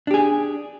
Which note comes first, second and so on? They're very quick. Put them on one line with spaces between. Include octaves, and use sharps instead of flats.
D4 G4 G#4